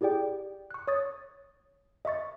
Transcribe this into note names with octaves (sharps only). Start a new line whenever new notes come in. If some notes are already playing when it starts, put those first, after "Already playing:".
E4 G4 G#4 D5 G5
C#6 F#6
C#5 C#6 D#6 A6
D#5 E5 C#6 A6